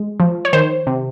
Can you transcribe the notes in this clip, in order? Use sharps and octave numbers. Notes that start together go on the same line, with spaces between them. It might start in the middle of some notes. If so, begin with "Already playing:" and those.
Already playing: G#3
F3
C#5
D#3 C5
C3